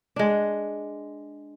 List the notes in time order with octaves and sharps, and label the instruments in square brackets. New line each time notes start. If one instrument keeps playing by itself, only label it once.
[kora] G#3 D4